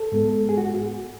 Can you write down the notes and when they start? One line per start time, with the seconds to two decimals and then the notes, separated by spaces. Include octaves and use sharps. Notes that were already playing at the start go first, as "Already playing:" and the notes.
Already playing: A4
0.12 G#2 G#3 B3
0.49 G#4
0.58 F#4